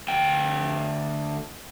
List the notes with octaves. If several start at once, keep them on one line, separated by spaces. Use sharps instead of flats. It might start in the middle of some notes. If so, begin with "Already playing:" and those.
D2 G5